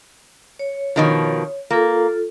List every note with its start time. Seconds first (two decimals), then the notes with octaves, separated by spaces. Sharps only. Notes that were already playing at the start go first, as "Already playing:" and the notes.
0.59 C#5
0.96 B2 D#3 F3
1.71 A#3 F4 A4